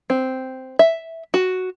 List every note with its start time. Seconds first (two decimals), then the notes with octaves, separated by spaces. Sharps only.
0.10 C4
0.79 E5
1.34 F#4